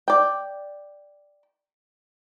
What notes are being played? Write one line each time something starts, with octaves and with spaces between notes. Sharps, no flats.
D5 G5